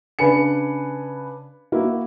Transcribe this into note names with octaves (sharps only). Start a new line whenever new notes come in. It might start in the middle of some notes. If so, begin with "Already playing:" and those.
C#3 D4 B4 G#5 C#7
A#3 E4 F#4